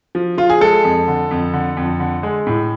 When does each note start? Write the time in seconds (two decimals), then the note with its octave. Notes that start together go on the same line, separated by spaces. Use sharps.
0.15 F3
0.37 F3 F4
0.50 G#4
0.61 G#3 A4
0.84 F2
1.08 D3
1.31 F2
1.53 D3
1.77 F2
2.00 D3
2.23 G#3
2.47 A2